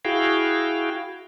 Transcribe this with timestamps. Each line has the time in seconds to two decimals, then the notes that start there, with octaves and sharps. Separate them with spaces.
0.05 E4 F#4 G#4 F5 G5